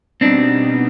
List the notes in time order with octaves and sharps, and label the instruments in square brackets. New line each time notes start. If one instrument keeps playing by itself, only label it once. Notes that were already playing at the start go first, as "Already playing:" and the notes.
[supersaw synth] B2 G3 B3 D#4 [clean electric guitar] C4 D4